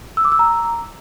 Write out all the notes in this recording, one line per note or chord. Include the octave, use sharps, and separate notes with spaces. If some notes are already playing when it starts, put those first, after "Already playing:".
E6
D6
E6
A#5